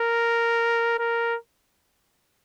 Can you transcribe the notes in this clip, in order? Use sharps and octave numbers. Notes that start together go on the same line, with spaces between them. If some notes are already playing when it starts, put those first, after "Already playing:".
Already playing: A#4
A#4